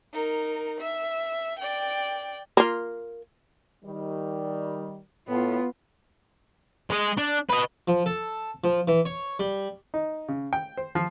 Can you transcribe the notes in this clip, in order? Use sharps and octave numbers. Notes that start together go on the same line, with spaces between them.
D#4 A#4
E5
D5 G5
A#3 F4
D#3 G3
A2 B3 F4
G#3 D#5
D4
B4 D#5
F3
A4
F3
E3
C#5
G3
D#4
C#3
G5
C5
F3